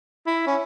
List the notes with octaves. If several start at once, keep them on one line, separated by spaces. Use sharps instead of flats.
E4
C#4